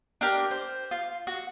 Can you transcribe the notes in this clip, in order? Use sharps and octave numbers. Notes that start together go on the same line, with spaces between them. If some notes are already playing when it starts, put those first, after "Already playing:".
D4 G4 A#4
C5
F4
F#4